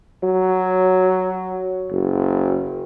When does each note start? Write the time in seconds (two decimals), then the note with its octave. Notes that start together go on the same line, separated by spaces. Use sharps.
0.23 F#3
1.91 F#1